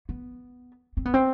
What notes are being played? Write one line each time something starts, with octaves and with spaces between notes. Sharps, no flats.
B3
C4
B3
C4